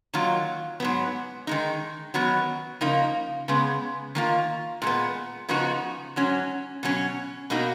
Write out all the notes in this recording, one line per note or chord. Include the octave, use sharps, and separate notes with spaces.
D#3 F#3 A#3 F4
G#2 F#3 B3
D#3 G#3 D#4
D#3 F#3 B3 F#4
C#3 F3 A#3 D#4
C#3 G#3 B3
D#3 A#3 F4
A#2 G#3 B3
C#3 F3 B3 D#4 F#4
G#2 F#3 C#4
B2 F#3 C#4
B2 A#3 D#4 F#4